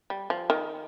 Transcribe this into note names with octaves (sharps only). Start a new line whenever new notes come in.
G3
F3
D#3